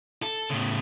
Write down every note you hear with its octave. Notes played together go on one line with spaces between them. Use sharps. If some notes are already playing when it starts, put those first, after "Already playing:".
A4
A2 C#3